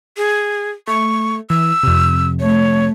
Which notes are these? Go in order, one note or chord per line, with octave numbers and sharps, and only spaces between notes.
G#4
A3 C#6
E3 E6
F2 C3
A3 C#5